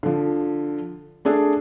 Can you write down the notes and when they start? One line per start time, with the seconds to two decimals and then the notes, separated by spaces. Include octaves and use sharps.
0.03 D3 F3
1.25 A3 D4 G#4 A4